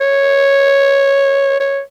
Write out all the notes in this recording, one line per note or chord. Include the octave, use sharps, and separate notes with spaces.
C#5
C#5